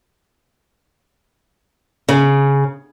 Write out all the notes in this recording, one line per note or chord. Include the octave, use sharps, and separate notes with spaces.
C#3